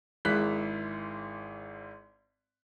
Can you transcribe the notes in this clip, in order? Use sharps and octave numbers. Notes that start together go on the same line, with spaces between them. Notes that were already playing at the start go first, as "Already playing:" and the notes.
G#1 G#2 E4 F#6 B6